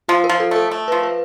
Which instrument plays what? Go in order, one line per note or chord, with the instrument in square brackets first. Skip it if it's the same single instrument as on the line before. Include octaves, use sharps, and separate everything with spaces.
[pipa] F3 [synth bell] F4
[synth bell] A#4
[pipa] F3
[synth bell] A4
[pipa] A3 [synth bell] A4
[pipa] A3
[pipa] F3 [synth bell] B4
[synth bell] B4